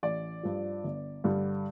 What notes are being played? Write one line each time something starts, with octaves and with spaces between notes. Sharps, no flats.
A1 D5
G2 F3
G1
G2 D3 G3